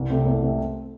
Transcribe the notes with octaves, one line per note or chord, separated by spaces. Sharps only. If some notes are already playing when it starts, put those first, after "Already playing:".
Already playing: C2
C3 A3 C4
C2
C3 A3